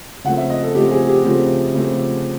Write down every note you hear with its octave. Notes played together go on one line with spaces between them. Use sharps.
C#3 F3 A3 C4 F#5
E5
D#5
A4
C#3 F3 A3 C4 G4
G#4
G4
C#3 F3 A3 C4 F4
C#3 F3 A3 C4